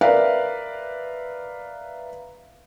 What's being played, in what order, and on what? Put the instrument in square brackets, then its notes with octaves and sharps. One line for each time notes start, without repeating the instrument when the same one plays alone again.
[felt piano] A#4 B4 D5 E5 F5